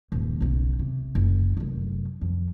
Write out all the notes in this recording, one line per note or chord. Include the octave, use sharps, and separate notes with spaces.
D#1 G2
B1 C#3
C3
F#1
F1 F#2
F2